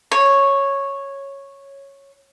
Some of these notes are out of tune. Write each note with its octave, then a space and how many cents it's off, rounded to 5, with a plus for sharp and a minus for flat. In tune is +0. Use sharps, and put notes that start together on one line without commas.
C#5 -5